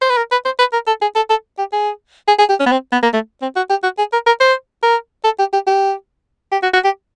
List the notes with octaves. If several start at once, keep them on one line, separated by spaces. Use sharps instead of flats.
C5
B4
A#4
B4
C5
B4
A#4
A4
G#4
A4
A4
G4
G#4
G#4
G#4
G4
C#4
B3
C4
B3
A#3
A3
C4
F#4
G4
F#4
G#4
A#4
A#4
C5
A#4
A4
G4
G4
G4
G4
F#4
F#4
G4